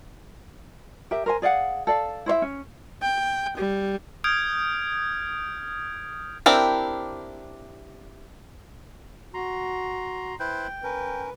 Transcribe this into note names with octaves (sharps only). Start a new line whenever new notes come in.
G4 A#4 E5
A#4 C5 G#5
G#4 D5 F5 F#5
A4 D5 F5
E4 C5 C#5 E5
C#4
G5
G3
D#6 F6 G6 G#6 D7
C4 D4 E4 G4 A#4
F#4 A#5 C6
E4 B4 C5 G5
C#4 A#4 B4